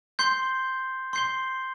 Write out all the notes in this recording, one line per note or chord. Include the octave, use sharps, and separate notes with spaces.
C6 G6 C7 G7
C6 G6 C7 G7